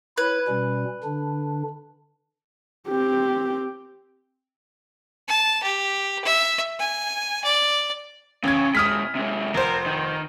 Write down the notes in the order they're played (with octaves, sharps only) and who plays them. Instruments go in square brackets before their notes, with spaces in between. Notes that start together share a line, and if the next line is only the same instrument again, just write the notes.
[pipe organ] E4 C#5 [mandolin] B4
[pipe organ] B2 G3 C#4
D3 D4
[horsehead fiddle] C4 G4
[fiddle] A5
G4
E5
G#5
D5
[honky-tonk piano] A1 G#6 [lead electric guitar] C#3
[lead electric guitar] C3 G#3 [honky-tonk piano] D#6 F6 B6
[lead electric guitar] C3 G#3
[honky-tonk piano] F1 C5 [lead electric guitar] A#4
[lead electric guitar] D#3